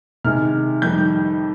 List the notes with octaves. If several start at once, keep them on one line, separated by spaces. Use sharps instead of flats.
C3 D#3 G#3 F6
F2 D#3 G3 G6